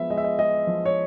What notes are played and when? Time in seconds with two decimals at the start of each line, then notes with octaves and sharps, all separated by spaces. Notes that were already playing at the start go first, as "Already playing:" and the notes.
Already playing: F3 G#3 B3 E5
0.10 G#3 D#5
0.18 E5
0.24 D#5
0.39 G#3 D#5
0.67 F3
0.85 C#5